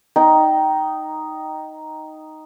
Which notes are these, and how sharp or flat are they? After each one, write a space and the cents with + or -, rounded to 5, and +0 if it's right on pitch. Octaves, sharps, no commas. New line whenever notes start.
D#4 +0 G5 -15